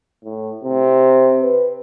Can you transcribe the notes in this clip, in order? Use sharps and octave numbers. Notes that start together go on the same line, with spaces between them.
A2
C3
B4